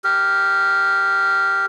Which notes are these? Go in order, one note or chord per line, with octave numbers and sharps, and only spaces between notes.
G4 A#4